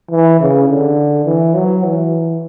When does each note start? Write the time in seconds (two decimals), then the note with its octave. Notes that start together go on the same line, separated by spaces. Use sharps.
0.11 E3
0.41 C#3
0.69 D3
1.26 E3
1.55 F#3
1.83 E3